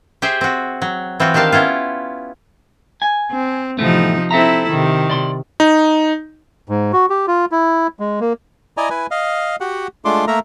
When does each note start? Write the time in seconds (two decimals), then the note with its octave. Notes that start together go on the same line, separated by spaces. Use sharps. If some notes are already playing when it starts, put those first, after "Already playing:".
0.22 G4 G#4 C5 E5
0.41 C4 F#4
0.82 F#3
1.20 E3 C4 F4 F#4
1.34 D#3 D4 G4 F5 A5
1.52 B3 C#4 E4 F4
3.02 G#5
3.31 C4
3.79 E2 A2 C3 F3 A3 D#4
4.31 C4 E4 A4 E5 A#5
4.70 C3 D#3
5.10 D5 C6
5.60 D#4
6.69 G#2
6.93 F#4
7.10 G4
7.28 F4
7.52 E4
7.99 G#3
8.20 A#3
8.77 E4 D5 D#5 G#5 A#5
8.90 E4 B4 G#5
9.11 D#5 F5
9.61 F#4 G4 F#5
10.05 G#3 A3 D4 F4 C6 D6
10.27 A3 A#3 A#4 E5 A#5